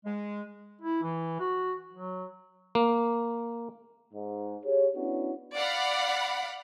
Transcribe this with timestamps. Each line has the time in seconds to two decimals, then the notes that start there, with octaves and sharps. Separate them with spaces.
0.05 G#3
0.82 E4
1.03 E3
1.40 F#4
1.93 F#3
2.75 A#3
4.13 G#2
4.65 G4 G#4 C#5
4.96 B3 C#4 D4 E4 F#4
5.54 D5 F5 F#5 B5